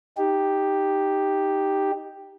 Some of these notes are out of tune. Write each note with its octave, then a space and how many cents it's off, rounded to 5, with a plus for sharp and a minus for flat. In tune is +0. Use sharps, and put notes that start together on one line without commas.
D#4 +0 G4 +0